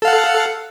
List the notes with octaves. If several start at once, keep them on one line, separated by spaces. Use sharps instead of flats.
A4 F5 F#5